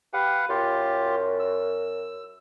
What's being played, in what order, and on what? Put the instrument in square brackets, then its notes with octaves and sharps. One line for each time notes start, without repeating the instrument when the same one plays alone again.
[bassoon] G4 [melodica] B4 F5 F#5
[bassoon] F#2 [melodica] F4 G4
[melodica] E6